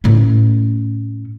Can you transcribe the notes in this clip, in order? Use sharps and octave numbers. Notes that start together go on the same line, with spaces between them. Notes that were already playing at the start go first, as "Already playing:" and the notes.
A2 C#4